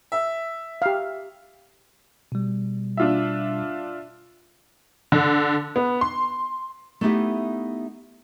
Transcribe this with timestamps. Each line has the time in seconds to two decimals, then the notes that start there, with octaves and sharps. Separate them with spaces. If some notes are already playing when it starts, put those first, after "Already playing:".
0.12 E5
0.82 G4 F5
2.32 B2 G3
2.97 D4 F4 E5
5.12 D3
5.76 B3
6.01 C6
7.01 A3 B3 D#4 E4 G4 E5